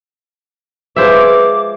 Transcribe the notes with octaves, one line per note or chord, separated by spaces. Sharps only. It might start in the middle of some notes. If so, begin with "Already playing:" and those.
F3 G#3 F4 B4 C5 E5 D6